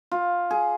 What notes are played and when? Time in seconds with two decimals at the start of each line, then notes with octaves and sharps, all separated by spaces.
0.11 F4
0.51 G#4